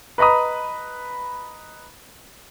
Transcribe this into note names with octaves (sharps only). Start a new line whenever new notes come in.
B4 D#5 A#5 B5 D#6